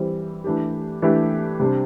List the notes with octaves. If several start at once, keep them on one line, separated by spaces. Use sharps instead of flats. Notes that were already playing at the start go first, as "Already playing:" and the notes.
Already playing: E3 G3 C4
E3 A3 D4 G4
E3 A3 D4 G4
C3 G3 D4 C5